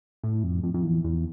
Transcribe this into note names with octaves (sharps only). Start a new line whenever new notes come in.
A2
F2
F2
F2
E2
E2